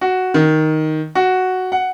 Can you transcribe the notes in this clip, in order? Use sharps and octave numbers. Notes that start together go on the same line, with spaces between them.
F#4
D#3
F#4
F#5